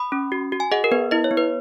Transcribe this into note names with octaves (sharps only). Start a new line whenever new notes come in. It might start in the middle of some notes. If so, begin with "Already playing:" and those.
Already playing: B5 D#6
C#4
F#4
F#4
G#5
G#4 D#5 F#5
A#4
B3 B4
E4 D#5
C#5
B3
B4